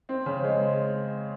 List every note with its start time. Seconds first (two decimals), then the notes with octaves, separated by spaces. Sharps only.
0.09 C4
0.26 C#3
0.44 G#3